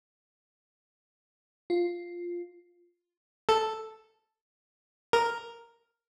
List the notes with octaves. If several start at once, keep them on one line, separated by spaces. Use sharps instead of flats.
F4
A4
A#4